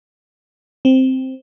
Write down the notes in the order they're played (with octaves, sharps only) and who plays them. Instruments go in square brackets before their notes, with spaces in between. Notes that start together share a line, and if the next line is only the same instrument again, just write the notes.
[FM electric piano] C4